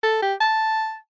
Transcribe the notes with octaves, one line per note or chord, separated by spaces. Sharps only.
A4
G4
A5